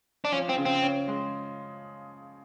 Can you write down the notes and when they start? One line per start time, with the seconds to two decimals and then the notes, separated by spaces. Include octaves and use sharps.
0.25 D4
0.32 F3 C#4
0.49 C4
0.57 C#3
0.66 C4
0.83 C#4
1.08 G#3